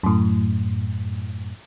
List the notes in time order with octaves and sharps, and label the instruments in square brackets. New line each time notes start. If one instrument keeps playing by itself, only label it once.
[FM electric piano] F#2 A2